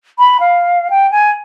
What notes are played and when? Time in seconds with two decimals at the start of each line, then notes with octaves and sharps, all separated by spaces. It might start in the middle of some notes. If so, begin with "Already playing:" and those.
0.19 B5
0.40 F5
0.90 G5
1.11 G#5